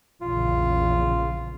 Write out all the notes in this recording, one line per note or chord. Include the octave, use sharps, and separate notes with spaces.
A#1 E2 C#3 F4